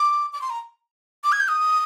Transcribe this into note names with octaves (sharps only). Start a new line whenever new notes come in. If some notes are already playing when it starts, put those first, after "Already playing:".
Already playing: D6
D6
C6
A#5
D6
G#6
G6
D#6